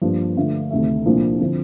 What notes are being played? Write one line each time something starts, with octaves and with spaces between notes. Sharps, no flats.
G2 F3 A#3 D4
D3 A3 D4 F4
D2 C3 D#3 A3
C2 A#2 F3 A#3 D4
D3 F3 C4